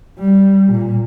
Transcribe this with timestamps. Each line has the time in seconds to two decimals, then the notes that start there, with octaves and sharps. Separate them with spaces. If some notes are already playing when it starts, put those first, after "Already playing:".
0.19 G3
0.73 A#2